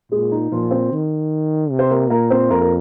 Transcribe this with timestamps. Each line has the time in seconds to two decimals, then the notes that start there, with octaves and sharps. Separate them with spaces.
0.12 A#2 G#3 G#4
0.31 D#4
0.52 A#2 F3 F4
0.71 C4 C5
0.91 D#3
1.71 C3
1.79 C5
1.90 A#3 A#4
2.10 A#2 A#3 A#4
2.30 C4 C5
2.50 F2 A#3 A#4
2.61 A#4